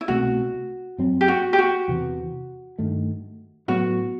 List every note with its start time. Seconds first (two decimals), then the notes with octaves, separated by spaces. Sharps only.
0.01 E4
0.08 C2 B2 A3 C4 F#4
0.98 F#2 F#3 C4
1.21 G4
1.28 F#4
1.53 G4
1.59 F#4
1.88 E2 C3 E3
2.78 G2 D#3 A3
3.68 A2 F#3 B3 F#4